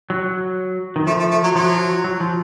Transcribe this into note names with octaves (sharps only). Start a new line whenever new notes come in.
F#3
D#3
F3 A3
A3
A3
F#3
F3 F#3
F#3
F3